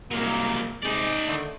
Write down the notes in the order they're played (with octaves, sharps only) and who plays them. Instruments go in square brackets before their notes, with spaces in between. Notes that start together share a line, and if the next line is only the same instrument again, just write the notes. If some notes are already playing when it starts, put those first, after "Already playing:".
[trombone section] C2 A#3 [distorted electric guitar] F#3 G#3
[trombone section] C3 G#3 [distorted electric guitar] D#4 D5
[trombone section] D3 D#3 A3